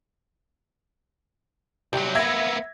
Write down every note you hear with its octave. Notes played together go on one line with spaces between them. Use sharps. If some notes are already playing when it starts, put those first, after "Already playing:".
C2 F#3 G4
A#3 B3 E5 G#6 A#6